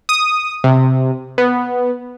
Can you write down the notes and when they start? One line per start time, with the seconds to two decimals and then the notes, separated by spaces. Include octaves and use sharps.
0.09 D#6
0.64 C3
1.38 B3